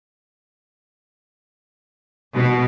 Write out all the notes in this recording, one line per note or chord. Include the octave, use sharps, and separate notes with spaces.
B2